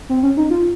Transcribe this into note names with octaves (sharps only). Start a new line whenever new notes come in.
C4
C#4
D#4
F4